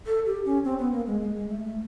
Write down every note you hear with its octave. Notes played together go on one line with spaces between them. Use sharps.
A4
G4
C#4
C4
B3
A#3
G#3
G#3
G#3
A3
A3